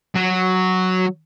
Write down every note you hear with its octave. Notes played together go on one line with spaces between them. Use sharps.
F#3